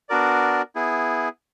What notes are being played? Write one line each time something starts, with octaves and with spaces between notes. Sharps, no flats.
B3 D4 F#4 A#4 D5
B3 E4 G#4